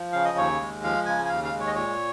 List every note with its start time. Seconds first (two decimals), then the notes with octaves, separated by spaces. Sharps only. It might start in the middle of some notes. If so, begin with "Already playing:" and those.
Already playing: F3
0.12 C#3 F5
0.25 D#5
0.37 D#2 C#5
0.61 G#3
0.84 F3 F5
1.06 C#3 G#5
1.25 G#5
1.29 D#2 F5
1.45 F5
1.52 G#3
1.60 C#5
1.67 D#5
1.75 A#2 C#5